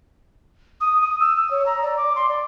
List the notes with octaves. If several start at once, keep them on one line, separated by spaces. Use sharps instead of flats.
D#6
D#6
E6
E6
C#5
A#5
D5
D6
C6
D5